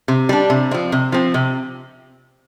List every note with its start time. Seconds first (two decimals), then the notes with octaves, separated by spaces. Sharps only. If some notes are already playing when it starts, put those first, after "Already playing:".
0.08 C3
0.29 G3 D4
0.50 C3
0.71 F3 C4
0.92 C3
1.12 F3 C4
1.34 C3